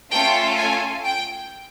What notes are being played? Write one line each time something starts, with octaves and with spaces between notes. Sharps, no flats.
A3 C#4 F4 A4 G5
G#5
G5